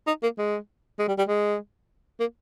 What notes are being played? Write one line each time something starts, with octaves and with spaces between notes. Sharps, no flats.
D#4
A#3
G#3
G#3
G3
G3
G#3
A#3